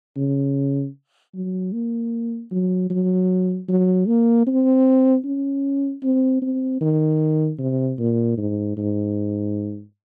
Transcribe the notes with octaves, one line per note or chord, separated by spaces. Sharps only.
C#3
F#3
A#3
F#3
F#3
F#3
A#3
C4
C#4
C4
C4
D#3
C3
A#2
G#2
G#2